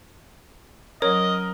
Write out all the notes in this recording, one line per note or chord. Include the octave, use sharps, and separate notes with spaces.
F#3 C#4 A#4 C#5 D#5